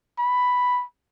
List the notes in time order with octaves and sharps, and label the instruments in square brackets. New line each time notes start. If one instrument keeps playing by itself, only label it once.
[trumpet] B5